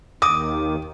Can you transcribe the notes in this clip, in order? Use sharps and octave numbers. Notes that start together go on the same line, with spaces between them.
D#2 D#3 D6 D#6